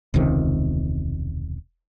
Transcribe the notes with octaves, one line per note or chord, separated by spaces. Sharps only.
E1 C#2 C3 D#3